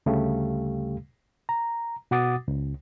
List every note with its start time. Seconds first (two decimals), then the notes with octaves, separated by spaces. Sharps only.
0.06 D2 C#3 G3 A3 G4 F5
1.49 A#5
2.11 B2 F#4 F#5 D6 D#6 A6
2.48 C#2